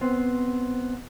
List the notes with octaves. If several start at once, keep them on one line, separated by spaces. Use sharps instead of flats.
B3 C4 C5